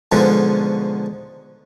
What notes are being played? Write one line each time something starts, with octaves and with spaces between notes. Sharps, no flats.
G#2 B2 D3 F3 F#3 G#3